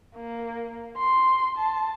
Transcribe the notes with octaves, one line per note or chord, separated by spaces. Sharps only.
A#3
C6
A5